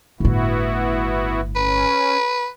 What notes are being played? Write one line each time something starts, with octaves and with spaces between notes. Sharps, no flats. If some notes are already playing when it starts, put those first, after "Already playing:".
G1 A2 B3 E4 F#4
C#4 B4